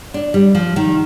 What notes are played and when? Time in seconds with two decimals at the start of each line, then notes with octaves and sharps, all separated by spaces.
0.14 D4
0.34 G3
0.55 F3
0.76 D#3